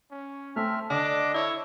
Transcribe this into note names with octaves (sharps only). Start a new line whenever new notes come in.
C#4
A3 C4 E5 F6
D3 D4 D#5 D6
E4 C#5